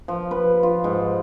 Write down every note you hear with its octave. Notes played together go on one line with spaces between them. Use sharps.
F3
B4
F4
G#2